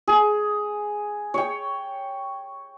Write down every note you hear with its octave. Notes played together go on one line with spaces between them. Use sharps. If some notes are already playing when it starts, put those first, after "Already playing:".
G#4
C#5 G5